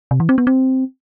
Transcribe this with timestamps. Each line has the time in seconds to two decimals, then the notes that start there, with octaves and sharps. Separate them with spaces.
0.11 C3
0.20 E3
0.29 C4
0.38 B3
0.47 C4